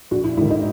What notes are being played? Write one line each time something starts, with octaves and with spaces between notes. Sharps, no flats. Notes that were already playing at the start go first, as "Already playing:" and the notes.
A#1 F#4
E4
G#2 D#3 E4
D#4